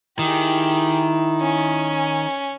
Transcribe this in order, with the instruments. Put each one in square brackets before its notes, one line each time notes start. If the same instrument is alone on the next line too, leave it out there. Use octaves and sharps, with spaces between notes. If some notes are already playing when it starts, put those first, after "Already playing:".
[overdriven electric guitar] D#3 [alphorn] E4 [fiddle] G4 G#4
[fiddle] C#4 G#5